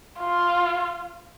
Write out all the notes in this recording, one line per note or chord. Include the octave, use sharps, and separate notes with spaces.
F4